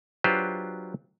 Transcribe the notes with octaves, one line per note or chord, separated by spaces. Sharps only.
F#3 D4 F4 G4 B4 C5